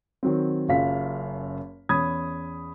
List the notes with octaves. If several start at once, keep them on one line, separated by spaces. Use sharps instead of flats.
D#3 F#3 C4
F#1 F#2 F4 F5 B6
E2 C#4 B5 D#6 G#6